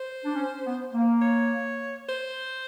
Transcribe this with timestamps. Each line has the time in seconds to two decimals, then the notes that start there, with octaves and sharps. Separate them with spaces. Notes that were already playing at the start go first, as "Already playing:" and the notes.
Already playing: C5
0.25 D4
0.35 C#4
0.64 B3
0.93 A#3
1.22 C#5
2.09 C5